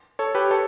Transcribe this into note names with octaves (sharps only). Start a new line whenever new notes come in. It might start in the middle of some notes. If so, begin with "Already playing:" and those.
A4 C#5
G4 B4
A4 C#5